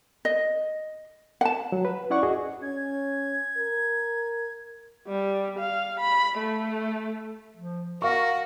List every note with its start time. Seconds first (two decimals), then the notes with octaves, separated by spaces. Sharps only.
0.25 D#5
1.41 F#5 A5
1.72 F#3
1.85 B4
2.10 C#4 E4 D5 F#5 C#6
2.23 F#4 G#4 D#5
2.62 C#4 G#6
3.58 A#4
5.08 G3
5.59 F5
6.00 B5
6.39 A3
7.56 F3
8.02 F#4 A#4 F5 C#6